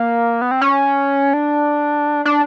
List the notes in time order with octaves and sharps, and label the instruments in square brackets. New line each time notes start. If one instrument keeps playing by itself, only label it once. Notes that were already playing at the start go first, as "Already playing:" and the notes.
Already playing: [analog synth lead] A#3
B3
C4
C#4
D4
D4